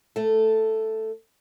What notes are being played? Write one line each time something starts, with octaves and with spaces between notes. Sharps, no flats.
A3 A4